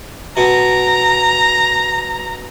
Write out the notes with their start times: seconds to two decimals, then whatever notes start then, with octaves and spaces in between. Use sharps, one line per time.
0.37 B2 A#5